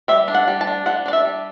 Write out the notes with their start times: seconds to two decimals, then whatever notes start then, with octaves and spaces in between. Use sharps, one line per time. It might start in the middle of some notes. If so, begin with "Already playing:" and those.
0.08 G3 E5
0.28 D4
0.35 F#5
0.48 G3
0.61 A5
0.67 D4
0.86 G3 F#5
1.06 D4 D5
1.13 E5
1.25 G3